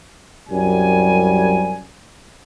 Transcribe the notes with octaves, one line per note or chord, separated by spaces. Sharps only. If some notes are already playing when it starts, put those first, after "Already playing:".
C2 F#2 G3 G#5